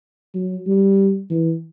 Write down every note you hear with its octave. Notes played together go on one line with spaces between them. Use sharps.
F#3
G3
E3